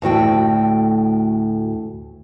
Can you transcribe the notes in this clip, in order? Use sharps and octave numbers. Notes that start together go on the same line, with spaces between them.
D2 A2 F#4 G5